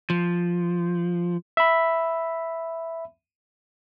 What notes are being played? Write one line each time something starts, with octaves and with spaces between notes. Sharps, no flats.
F3
E5 B5